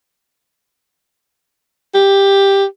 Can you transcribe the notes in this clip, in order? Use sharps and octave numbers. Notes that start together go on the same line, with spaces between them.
G4